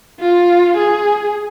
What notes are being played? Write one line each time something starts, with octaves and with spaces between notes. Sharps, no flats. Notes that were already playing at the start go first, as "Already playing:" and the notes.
F4
G#4